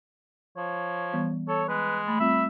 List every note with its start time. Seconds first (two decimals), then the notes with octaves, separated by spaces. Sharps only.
0.57 F3 C#5
1.13 E3 G3 B3
1.48 A4 C#5
1.68 G#3 B4
2.08 A3 B5
2.20 G3 C4 F4 E5